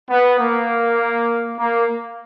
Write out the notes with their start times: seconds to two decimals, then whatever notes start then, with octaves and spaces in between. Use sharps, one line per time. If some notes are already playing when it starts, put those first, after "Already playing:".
0.09 B3
0.39 A#3
1.58 A#3